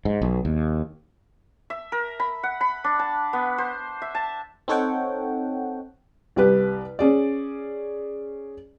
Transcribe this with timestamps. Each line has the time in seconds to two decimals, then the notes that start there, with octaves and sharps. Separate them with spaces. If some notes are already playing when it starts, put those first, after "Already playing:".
0.05 G#2
0.21 B1
0.45 D#2
1.70 E5
1.92 A#4
2.20 B5
2.43 F#5
2.61 B5
2.84 D4
2.99 A5
3.33 B3
3.58 C5
4.02 E5
4.15 A5
4.68 C4 D#4 A4 C#5 F#5 G5
6.36 C2 G4 B4
6.99 C#4 G#4 D5